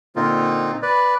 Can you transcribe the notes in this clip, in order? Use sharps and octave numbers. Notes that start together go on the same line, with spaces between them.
A#2 D3 A#3 C4 D#4 F4
B4 D5